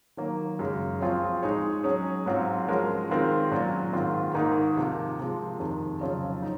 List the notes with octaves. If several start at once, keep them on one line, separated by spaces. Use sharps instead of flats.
D#3 F#3 A#3
F#2 C#3 G#3
F3 C4 F4 G#4 C#5
G#3 D#4 G#4 C#5
F#3 C#4 G#4
G#2 F#3 C4 F4
F3 G#3 C#4 F#4 A#4
D#3 G#3 C4 F4 A#4
A#2 F#3 C#4 F#4
G#2 D#3 G#3 C4 F4
G#2 D#3 A#3 D#4 G#4
C3 F3 A#3 F4
C3 F3 G#3
F2 C3 D#3
F2 C#3 F#3 C#4 F4
D#4